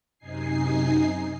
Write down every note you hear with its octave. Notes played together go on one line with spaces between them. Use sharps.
F#2 C3 D#4 G#5 C7